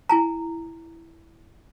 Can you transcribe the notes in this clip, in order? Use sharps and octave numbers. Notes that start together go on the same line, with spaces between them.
E4 G#5 A#5